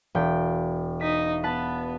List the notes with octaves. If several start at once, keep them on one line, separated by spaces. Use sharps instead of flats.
E1 G5
D#4 B6
B3 B4 A5